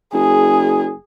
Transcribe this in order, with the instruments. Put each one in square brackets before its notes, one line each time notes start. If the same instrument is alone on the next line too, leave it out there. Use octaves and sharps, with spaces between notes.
[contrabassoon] F#1 [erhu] G#4